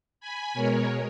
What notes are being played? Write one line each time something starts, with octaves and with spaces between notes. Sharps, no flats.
G#5 B5
B2 G#3 A#4 C#5